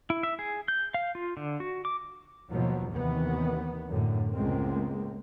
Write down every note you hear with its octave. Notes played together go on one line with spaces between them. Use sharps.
E4
E5
G#4
G6
F5
F4
D3
F#4
D6
D#2 B2 F3 F#3
D#2 C3 D#3 E3 B3
F#2 A2 D3
C#2 A2 G#3 A#3 C4